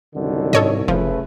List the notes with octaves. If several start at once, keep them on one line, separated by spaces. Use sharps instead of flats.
C2 F#2 D3 D#3
G#2 A4 C#5 D#5
F1 C#3 F3 A3 B4